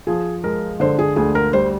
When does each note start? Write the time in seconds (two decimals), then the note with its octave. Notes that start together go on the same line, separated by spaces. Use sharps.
0.07 F3 G#4
0.44 G#3 A#4
0.80 D3 C5
0.99 G#4
1.16 D2 G#4
1.35 A#4
1.53 G3 C5